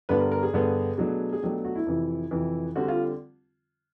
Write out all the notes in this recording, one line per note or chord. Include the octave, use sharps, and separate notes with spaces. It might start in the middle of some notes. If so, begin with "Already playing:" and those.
G2 D3 G3 B3 D4 B4
A#4
A#4
G#4
G2 D3 G3 B3 D4
B2 F#3 A3 D4 G#4
G#4
B2 F#3 A3 D4 G4
F#4
E4
F2 C3 E3
F2 C3 E3
D3 G3 C4 F#4
F4